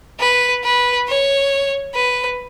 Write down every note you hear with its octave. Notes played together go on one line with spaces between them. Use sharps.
B4
B4
C#5
B4